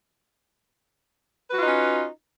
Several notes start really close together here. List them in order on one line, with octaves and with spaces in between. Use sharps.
B4 F#4 F4 D#4 C#4